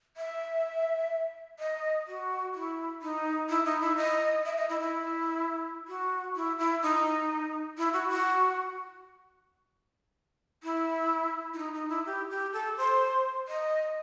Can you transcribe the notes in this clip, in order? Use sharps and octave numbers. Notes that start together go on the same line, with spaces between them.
E5
D#5
F#4
E4
D#4
E4
D#4
E4
D#5
E5
D#5
E4
E4
F#4
E4
E4
D#4
E4
F#4
F#4
E4
E4
D#4
D#4
E4
G4
G4
A4
C5
D#5